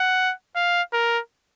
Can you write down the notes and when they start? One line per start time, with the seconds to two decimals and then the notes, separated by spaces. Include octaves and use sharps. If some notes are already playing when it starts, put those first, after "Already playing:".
Already playing: F#5
0.56 F5
0.93 A#4